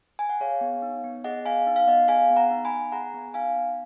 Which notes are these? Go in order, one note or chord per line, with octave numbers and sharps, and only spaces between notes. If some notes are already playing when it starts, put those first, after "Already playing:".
G#5
F#5
G#4 C#5 F5
B3
D#4
B3
G#4 D#5 F#5
B3 F5 G#5
D#4
F5
B3 D#5 F#5
G#4 F5 G#5
B3
F#5 A#5
D#4
G#5 B5
B3
G#4 F#5 A#5
B3
D#4 F5 G#5
B3